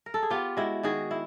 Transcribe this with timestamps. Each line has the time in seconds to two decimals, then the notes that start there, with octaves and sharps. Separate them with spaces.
0.06 A#4
0.14 A4
0.23 G#4
0.30 B3 F4 G4
0.57 G#3 E4 F#4
0.83 D#3 F#4 G#4
1.11 E4